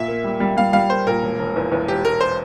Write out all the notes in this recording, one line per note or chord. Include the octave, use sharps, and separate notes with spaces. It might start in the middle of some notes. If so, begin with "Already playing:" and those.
Already playing: A#2 E5
A#3
G3
G3
G3 F5
G3 F5
A#3 C5
A#2 A#4
E1
E1
E2
E2
E1 G4
E1 A#4
C5